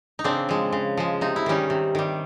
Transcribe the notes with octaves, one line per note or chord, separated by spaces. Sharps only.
D#4
C#3 C4 D4
F3 G#3
C#3
F3 G#3
C3 D#4
E4
D#3 G3 C#4 D#4
C3
D#3 G3